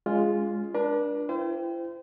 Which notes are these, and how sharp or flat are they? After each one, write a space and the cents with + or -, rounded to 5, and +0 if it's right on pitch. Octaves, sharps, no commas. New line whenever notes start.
G#3 +0 C#4 +35 F4 +0
D4 +0 A#4 +45
E4 +45 C5 -30 G5 +0